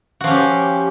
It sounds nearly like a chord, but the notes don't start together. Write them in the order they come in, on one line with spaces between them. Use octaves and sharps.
F#4 F3 C#4 G4